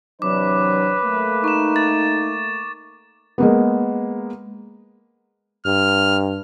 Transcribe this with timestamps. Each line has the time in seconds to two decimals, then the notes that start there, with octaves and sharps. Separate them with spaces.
0.22 C3 E3 F#3 D4 B4 D6
1.04 A3 A#3
1.44 D#4 C#6 E7
1.76 A6
3.38 G#3 A#3 B3
5.66 G2 F6